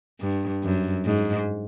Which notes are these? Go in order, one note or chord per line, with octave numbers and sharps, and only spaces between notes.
G2
F#2
G#2